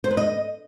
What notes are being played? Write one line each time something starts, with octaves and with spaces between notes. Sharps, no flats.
C5
B4
D#5